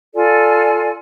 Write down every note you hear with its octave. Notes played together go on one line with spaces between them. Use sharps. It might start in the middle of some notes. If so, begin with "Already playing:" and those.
F4 A4 D5 G#5